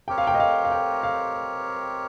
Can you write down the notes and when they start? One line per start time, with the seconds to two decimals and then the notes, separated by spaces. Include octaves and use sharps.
0.08 C4 G4 A#4 C#5 G5
0.18 F5
0.27 G5
0.34 D#5
0.40 F5
0.65 F5
0.72 G5
1.03 F5